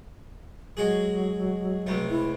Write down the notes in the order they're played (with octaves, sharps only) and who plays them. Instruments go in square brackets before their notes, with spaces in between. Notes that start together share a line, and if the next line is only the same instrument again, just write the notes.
[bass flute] F#3 [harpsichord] G#3 F#4 G#4
[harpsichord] C#2 C3 A3
[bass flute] E4